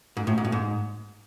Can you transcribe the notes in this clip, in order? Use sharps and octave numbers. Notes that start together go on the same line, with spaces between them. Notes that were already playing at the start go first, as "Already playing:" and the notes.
G#2
A2
G#2
A2
G#2